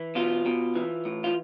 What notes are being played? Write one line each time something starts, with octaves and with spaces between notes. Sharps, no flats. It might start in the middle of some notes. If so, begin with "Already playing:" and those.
Already playing: E3
B2 F4
B2
E3
A2
F4